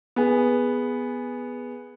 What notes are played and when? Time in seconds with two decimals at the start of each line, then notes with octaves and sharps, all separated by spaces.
0.16 B3 G#4